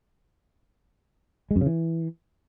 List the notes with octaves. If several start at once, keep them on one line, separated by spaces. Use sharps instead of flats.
G#3
F#2
C#3
E3